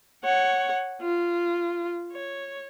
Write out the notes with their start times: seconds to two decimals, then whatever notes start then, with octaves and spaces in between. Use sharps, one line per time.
0.24 C#5 F#5
1.02 F4
2.12 C#5